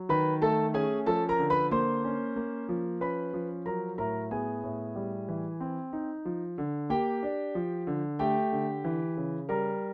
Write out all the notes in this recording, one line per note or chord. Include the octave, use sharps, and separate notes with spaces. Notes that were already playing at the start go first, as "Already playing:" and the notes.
Already playing: F#3
D#3 B4 B5
A3 A4 A5
C#4 G#4 G#5
F3 A4 A5
A#4 A#5
D3
B4 B5
A#3 C5 C6
C#4
A#3
F3
C#4 B4 B5
F3
F#3 A#4 A#5
A2 A#4 A#5
B3 G#4 G#5
A2
G3
E3
C4
D#4
F3
D3
A#3 G4 G5
D4
F3
D3
A3 G4 G5
D3
E3
C#3
G3 A#4 A#5